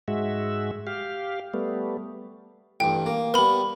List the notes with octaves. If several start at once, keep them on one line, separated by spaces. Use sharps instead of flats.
G#2 G#3 F#4 E5
G4 F5
G3 A3 B3
A1 G2 G5
A#3
G3 B3 A#4 B5